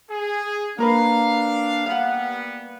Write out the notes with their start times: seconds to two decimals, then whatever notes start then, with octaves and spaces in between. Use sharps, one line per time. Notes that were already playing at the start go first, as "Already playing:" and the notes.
0.10 G#4
0.78 A#3 D4 A#4 B4 F5
1.86 G3 B3 F5 F#5